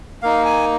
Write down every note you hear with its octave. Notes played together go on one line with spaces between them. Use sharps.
A#3 D#4 F5
G#5